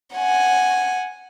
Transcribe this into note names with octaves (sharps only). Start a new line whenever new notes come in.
F#5 G#5